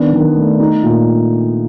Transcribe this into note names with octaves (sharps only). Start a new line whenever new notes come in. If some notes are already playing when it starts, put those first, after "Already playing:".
Already playing: D#3 B3 D4
D#3
A3
D#4
A#2